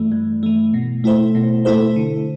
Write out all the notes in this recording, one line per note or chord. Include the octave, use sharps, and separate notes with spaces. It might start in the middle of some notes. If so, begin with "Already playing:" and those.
Already playing: G2 E3 A3
G2
E3 A3
B2
A3 E4 A4 C5
B2
A3 E4 A4 C5
D3